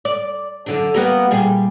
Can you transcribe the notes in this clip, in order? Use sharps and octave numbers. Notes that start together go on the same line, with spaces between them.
D5
F#2 D3 D4
G3 A#3 B3
A#2 G3 G#4